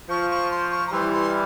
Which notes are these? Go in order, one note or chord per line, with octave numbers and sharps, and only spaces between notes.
F3 C#6
C#6
C6
C#6
A#5
E3 G3 C6
C6